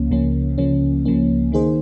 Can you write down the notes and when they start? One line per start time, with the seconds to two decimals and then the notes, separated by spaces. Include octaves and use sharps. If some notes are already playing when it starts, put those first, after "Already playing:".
Already playing: C#2 C#3 F3 A#3 C#4
0.11 C#2 C#3 F3 A#3 C#4
0.58 C#2 C#3 F3 A#3 C#4
1.05 C#2 C#3 F3 A#3 C#4
1.52 D#3 A#3 D#4 G#4 C5